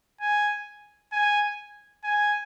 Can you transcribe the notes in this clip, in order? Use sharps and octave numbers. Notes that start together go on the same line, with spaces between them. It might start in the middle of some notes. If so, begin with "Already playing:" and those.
G#5
G#5
G#5